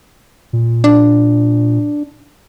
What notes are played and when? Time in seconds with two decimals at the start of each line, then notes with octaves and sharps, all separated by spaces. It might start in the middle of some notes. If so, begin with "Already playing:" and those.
0.53 A#2
0.84 D4